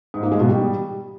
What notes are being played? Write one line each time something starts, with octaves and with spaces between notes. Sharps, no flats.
G#2
A#3
G#3
B2
G3